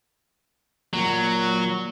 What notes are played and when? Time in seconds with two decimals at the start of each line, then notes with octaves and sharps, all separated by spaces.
0.94 A#2 F#3